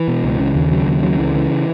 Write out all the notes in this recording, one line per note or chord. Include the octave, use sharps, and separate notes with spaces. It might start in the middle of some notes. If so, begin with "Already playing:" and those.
Already playing: E3
B2
C#2
C#3
D#2
C#3 F#3
D#2
C#3 F#3
C#2 E3
C#3 E3